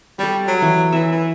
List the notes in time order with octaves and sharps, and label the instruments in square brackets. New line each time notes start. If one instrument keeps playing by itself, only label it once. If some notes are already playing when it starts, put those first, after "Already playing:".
[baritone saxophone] G3 [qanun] A4 C#6
[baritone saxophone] F#3
[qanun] E3
[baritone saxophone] E3 [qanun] E5
[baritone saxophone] E3